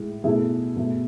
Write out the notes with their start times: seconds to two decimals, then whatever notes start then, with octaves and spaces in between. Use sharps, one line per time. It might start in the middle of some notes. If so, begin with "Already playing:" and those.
Already playing: A2 G#3
0.24 B2 A3 E4 G#4
0.76 B2 A3